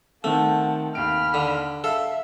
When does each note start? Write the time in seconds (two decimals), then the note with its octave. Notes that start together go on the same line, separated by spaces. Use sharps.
0.24 D#3 A3 C4 F#5 A5
0.95 D#2 G5 B5 F6 D7
1.34 D3
1.84 A4 E5 F5